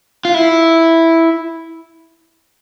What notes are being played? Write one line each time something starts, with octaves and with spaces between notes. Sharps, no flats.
F4
E4